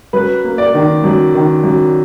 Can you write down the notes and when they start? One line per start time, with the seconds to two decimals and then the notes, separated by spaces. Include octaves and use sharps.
0.13 F#2 B4
0.44 A#3
0.58 D5
0.74 D#3
1.04 F#2
1.34 D#3
1.64 F#2